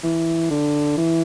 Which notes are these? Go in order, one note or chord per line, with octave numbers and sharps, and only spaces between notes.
E3
D3
E3